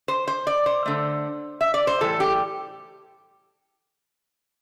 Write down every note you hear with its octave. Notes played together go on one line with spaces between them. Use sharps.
C5
C5
D5
C5
D3 A3
E5
D5
C5
A2 E3 G3 A4
G4